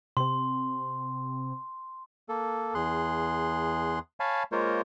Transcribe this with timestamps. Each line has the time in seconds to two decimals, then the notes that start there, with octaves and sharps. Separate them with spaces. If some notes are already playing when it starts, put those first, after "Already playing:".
0.17 C3 C4 C6
2.29 A#3 A4
2.75 E2 G#4 C6 F#6
4.20 C#5 F5 G#5 A5 B5
4.52 G#3 A#3 F4 A#4 C5 C#5